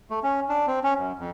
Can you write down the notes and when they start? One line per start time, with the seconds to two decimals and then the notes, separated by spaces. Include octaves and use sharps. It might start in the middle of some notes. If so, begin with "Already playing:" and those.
0.10 A3
0.23 C#4
0.49 D4
0.67 C4
0.84 C#4
0.98 F#2
1.19 F2